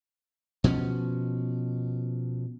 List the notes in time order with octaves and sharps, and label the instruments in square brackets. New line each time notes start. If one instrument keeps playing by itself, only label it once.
[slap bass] B2 F3 C4 C#4